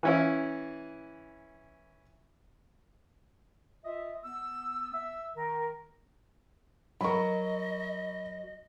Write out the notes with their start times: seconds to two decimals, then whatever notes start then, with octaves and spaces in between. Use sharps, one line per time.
0.03 E3 C#4 E4
3.84 F4 D#5 E5
4.24 B3 E6
4.94 E5 E6
5.35 D#3 A#4
7.01 F#3 A#4 D#5 B5 C#6